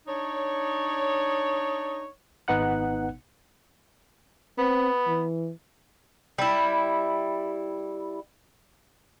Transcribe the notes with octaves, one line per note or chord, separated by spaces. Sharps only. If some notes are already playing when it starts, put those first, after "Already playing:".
D4 D#4 C#5
G#1 B3 D#4 F#5 F#6
B3 C4
E3
G3 E4